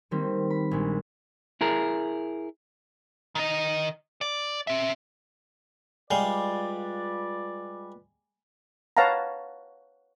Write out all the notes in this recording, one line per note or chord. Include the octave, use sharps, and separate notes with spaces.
D#3 G3 A#3 C4
B5
A#1 G#3
E4 G#4 A#4
D#3 D#5
D5
C4 E5
G3 G#3 F4 B4 D5 F5
B4 C#5 F5 F#5 A5 A#5